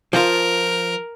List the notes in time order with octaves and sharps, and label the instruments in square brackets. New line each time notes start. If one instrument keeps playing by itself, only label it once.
[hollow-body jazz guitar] F3 F4 [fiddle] A#4